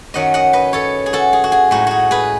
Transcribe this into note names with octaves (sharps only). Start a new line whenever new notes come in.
F#2 D#3 F#3 C#4 D#5 F#5
D#5 F#5
B4 D#5
A4 C#5
G#4
F#4 A4
G#4
F#4
G#4
A2 G#3 D#4 F#4
F#4 G#4
G#4 B4